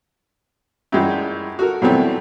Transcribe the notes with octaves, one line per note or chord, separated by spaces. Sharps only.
F#2 E3 G3 G#3
F#4 A4 A#4
B2 E3 F#3 G3 A3 C4